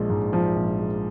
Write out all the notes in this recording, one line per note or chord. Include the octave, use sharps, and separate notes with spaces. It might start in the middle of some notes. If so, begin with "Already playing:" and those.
Already playing: A#1 F3 G#3
G#2
F3
A#1
G#3